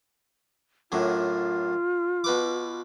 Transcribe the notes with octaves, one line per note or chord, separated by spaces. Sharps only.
F#2 A2 D3 F4
B2 B4 D6